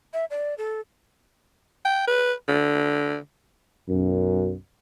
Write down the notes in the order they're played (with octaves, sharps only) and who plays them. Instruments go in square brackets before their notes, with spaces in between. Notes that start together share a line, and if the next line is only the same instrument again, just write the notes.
[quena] E5
D5
A4
[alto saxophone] G5
B4
D3
[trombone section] B1 F#2